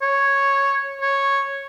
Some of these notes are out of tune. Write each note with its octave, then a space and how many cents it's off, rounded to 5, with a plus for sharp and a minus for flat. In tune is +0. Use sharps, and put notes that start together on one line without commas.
C#5 -5
C#5 -5